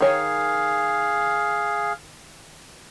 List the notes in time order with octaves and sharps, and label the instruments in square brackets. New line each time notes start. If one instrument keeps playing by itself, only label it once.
[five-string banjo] D#3 C#5 G#5 [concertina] G#4 F5